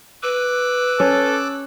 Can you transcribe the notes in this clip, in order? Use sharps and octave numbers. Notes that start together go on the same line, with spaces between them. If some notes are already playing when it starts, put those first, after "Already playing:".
B4 D6 E6 F#6
C#4 A4 C#5